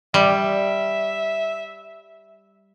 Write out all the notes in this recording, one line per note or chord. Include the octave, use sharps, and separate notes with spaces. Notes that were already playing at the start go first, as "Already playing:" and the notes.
G3 E5